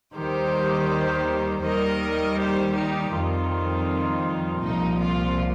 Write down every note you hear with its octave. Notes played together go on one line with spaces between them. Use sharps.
D#2 D#3 G3 G4 C5
D#2 D#3 G3 A#4 D#5
G4 C5
D#4 G4
F2 D#3 G3 F4
C2 A#2 F3 D#4
F4